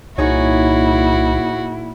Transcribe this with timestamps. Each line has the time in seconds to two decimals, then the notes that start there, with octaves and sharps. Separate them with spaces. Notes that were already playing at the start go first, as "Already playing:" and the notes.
0.18 C2 A#2 D#4 E4 F#4 G#4 C#5